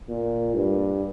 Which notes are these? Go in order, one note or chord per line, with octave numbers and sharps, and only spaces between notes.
A#2
G2